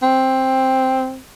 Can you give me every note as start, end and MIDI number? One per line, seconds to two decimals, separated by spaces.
0.03 1.18 60